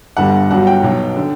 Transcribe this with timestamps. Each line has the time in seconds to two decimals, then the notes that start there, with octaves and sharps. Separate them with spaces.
0.17 G1 G2 D3 G3 F#5
0.51 G1 G2 F#3 F#5
0.67 G5
0.83 B1 B2 F#3
1.17 D3